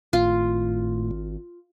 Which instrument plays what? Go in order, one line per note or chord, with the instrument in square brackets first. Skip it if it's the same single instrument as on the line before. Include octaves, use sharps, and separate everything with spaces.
[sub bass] G#1 [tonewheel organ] A2 [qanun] F4